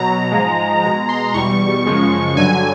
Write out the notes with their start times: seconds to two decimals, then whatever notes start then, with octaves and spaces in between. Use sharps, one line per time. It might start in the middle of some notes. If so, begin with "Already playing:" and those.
Already playing: B2 F#3 A#5
0.32 G#2 F3 G#3
0.83 B2 G#3 A#5
1.09 C6
1.34 E2 B2 G3 C#6
1.86 F#2 C#3 F3 G#3
2.36 G2 D3 F#3 G#5